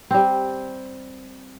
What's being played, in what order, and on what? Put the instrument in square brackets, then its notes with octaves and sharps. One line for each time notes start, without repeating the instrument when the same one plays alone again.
[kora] G3 C4